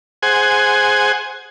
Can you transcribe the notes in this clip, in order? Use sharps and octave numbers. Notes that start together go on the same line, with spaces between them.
G#4 C5 F#5 G#5